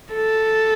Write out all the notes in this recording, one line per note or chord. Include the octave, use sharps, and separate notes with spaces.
A4